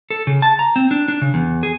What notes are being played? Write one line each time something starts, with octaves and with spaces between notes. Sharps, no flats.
A4
C#3
A5
A#5
C4
D4
D4
C#3
E2
G#4